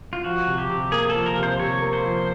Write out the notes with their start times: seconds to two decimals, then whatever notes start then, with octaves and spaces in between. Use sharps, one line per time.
0.13 F4
0.24 F3 F#4
0.47 C3
0.58 G4
0.70 C3
0.92 A#3 G#4
1.09 A4
1.15 F3
1.26 A#4
1.37 C3
1.43 C5
1.59 C3 C#5
1.82 A#3
1.93 C5
2.04 F3